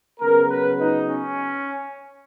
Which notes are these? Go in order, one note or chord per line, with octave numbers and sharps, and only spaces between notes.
C#3 F#3 B3 A#4
B4
D#4
C#4